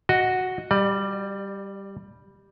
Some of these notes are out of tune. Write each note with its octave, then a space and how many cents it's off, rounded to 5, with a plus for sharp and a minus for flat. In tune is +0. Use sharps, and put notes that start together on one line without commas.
F#4 +0 D#5 +5
G3 +0 D5 +35